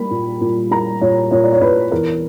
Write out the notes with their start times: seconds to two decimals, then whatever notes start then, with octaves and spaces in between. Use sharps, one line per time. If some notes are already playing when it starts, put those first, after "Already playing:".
Already playing: G3 A#3 B5
0.11 A#2
0.41 A#2
0.71 A#3 A#5
1.01 A#2 C#5
1.31 A#2 C#5
1.44 D5
1.53 C#5
1.61 A#2 B4
1.92 E2 A#4